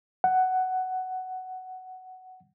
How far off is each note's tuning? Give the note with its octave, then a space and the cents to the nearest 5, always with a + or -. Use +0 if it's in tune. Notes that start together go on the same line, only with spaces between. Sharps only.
F#5 +10